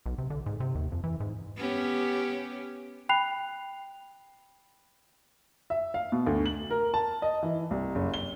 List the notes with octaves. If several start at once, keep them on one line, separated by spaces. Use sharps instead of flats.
B1
C3
D3
G#2
C3
D#2
F2
E3
G#2
B3 C#4 G4
G5 B5 F#6 C7 F7
E5
F5
B2
D2
F#7
A#4
A5
D#5
E3
C2
F#1
G7